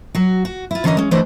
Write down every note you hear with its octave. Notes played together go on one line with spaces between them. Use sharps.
F#3 F#4
F#4
E4 F4
D3 E3 C#4 A4 A#4 D#5
G#3 C#4
E3 A3 D4 E4 C5 D#5